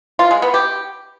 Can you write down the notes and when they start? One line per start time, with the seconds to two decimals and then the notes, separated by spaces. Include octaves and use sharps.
0.19 F4
0.31 G#3
0.42 B3
0.54 G4